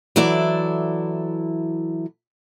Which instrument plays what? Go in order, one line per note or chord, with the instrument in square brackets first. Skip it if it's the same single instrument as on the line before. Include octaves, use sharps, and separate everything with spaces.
[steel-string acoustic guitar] E3 F#3 E4 A4 D5